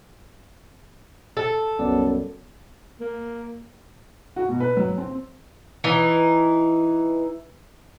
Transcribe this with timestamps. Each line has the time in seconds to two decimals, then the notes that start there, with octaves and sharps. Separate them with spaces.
1.37 A4
1.79 C2 F#2 B3 D5
3.00 A#3
4.36 F#4
4.49 B2
4.60 B4
4.77 F#3
4.98 C4
5.84 E3 D#4